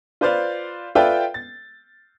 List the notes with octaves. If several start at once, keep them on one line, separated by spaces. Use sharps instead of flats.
F4 B4 C5 D5 F5
F4 A4 B4 D5 E5 G5
A6